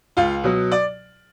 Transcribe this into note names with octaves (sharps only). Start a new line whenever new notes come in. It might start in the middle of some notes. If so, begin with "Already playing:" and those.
C#2 F4 F5
B2 F#3
D5